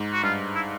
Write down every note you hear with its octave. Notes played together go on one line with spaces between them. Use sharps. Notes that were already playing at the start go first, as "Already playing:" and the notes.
Already playing: G#2
F#4
G2 F4
E4